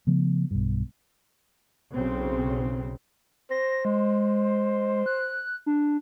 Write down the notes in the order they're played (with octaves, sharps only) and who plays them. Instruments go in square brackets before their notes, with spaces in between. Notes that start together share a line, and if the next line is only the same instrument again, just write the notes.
[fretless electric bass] C#3 F3 A3 B3
B1 G2
[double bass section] B1 C#3 C4
[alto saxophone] C5 [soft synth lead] A#6
[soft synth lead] G#3
F#6
D4